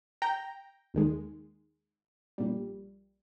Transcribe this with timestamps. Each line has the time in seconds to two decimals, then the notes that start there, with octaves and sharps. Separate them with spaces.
0.22 G5 A#5
0.94 D#2 D#3 G#3
2.38 A#1 A#2 G3